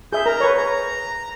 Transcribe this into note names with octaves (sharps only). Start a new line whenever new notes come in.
G#4 E5 G6
A#4 A#5
B4 C#5
A#5